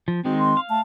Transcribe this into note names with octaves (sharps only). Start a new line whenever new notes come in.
F3
D#3 G#3 C4 D#4 F#4
C6
F5
A3 A5